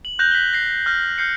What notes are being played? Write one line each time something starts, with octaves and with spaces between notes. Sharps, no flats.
F#7
F#6 G6 A#6 F7
B6 F#7 G7
A#6 C7
F6 G6 A#6
F6 G6 C7 C#7